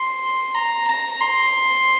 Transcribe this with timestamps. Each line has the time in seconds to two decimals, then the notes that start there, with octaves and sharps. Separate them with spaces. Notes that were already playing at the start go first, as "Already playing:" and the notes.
Already playing: C6
0.54 A#5
0.87 A#5
1.20 C6